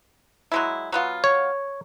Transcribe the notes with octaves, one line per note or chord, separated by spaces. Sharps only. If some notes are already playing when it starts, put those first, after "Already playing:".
F#3 G#3 E4
F#3 B3 F4
C#5